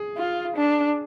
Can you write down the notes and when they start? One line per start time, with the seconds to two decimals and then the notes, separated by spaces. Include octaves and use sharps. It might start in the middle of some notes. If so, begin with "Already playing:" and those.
Already playing: G#4
0.17 F4
0.56 D4